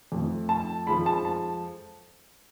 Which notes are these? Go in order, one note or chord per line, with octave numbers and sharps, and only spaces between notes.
F2 F3 A3
A5
F2 F3 G#3 B5
A5
A5